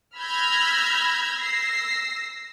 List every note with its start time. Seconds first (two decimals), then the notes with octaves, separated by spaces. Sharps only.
0.18 B5 E6 F6 G6 G#6 A#6
1.37 E6 A#6 C7